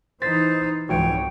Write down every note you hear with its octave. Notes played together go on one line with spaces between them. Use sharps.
E3 D#4 C5 A6 B6
C2 F2 G#2 E3 F#4 C#5 G5 D7